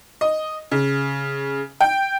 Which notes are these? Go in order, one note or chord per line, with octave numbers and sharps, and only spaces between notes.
D#5
C#3
G5